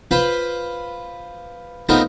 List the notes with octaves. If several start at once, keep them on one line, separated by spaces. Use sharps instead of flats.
F4 B4 C5 B5
A3 B3 C4 D#4 F4 A#4